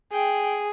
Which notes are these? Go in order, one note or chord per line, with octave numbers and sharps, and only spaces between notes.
G#4 G5